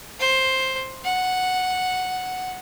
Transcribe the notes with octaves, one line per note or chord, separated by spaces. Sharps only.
C5
F#5